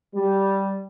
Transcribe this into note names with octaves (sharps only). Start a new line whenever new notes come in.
G3